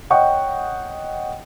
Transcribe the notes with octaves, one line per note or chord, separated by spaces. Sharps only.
C#5 D#5 F#5 G5 C#6